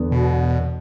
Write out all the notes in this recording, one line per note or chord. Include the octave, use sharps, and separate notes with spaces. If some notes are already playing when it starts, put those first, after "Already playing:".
Already playing: E1 E2 D3 B3
B2